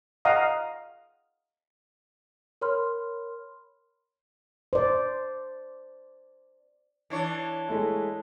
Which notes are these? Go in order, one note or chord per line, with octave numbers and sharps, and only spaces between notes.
D#5 F5 F#5 A#5 D#6
A#4 C#5 B5 C6 F6
C5 D5
E3 D4 C#5
G#3 A3 E4